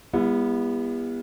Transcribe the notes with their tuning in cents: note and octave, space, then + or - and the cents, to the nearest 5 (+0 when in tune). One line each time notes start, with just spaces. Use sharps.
G3 +40 B3 -20 E4 +25